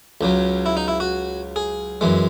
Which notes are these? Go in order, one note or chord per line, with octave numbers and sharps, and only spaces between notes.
C#2 C#3 F#3
E4
D#4
E4
F#4
G#4
F#2 E3 G#3